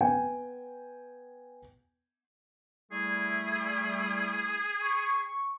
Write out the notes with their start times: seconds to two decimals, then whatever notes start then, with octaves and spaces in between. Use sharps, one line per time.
0.01 B3 G5 G#5
2.92 G3 A3 E4 G#4
4.82 C#6